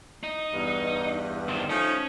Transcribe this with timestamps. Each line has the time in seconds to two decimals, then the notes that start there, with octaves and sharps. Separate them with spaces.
0.23 D#4
0.53 E2 G2
1.49 D#3 C4
1.69 F3 A3 C#4 D#4